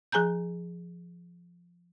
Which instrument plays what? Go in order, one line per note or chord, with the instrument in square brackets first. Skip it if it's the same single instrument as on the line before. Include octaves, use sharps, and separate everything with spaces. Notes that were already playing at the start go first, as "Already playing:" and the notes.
[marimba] F3 G#4 G#5 A#5 G6